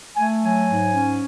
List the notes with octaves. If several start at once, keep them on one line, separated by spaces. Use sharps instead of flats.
A3 G#5
F#3 G#5
G#2
C#4